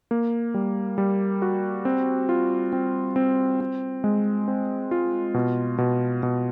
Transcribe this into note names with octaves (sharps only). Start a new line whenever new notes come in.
A#3
G3
G3
F#4
C4
F4
C4
C4
C4
G#3
C4
F4
B2
B2
B2